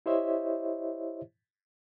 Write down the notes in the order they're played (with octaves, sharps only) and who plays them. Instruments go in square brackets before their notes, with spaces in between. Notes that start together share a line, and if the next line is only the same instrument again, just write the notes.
[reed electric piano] E4 G4 C5 C#5 D#5 E5